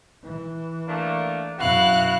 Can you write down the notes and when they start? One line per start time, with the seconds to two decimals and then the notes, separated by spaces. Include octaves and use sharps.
0.24 E3
0.88 A3 A#3 D4
1.59 F#2 B2 E4 F#4 F5 F#5 F#6